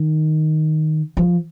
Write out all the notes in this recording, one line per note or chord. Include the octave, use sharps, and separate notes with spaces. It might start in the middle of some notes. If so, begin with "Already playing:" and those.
Already playing: D#3
F3